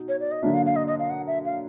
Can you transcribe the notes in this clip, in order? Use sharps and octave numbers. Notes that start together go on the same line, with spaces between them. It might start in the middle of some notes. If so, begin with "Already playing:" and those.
Already playing: B2 D#4
C#5
D5
D#5
D3 F#3 A#3 D4 E5
F5
F5
D#5
D#5
F5
F#5
E5
F5